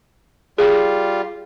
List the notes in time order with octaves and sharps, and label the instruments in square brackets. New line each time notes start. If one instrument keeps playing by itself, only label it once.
[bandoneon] G3 F4 [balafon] G#4